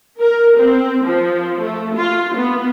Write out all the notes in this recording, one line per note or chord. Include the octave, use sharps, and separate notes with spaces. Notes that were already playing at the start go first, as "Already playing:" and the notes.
A#4
C4
F3
A3
F4
B3